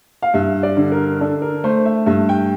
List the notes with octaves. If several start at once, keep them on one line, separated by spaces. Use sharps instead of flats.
F5
G2 E5
D5
D3
A#4
D4 A4
A#4
A3 C5
E5
G2 E5
G5